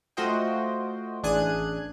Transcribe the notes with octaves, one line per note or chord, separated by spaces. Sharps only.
A3 F4 F#4 C5 D#5 G5
A1 D4 G#4 F#6 G#6 D#7